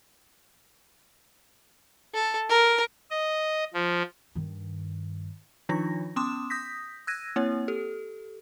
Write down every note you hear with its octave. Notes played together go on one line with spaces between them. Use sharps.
A4
A#4
D#5
F3
G2 D#3
D#3 F3 D4 D#4 F4 A#6
B3 C#4 C6 D6 D#6 E7
D#6 G6 A#6 B6
E6 F#6 G#6 A#6 D#7
A#3 C4 E4 C#5
G4 A4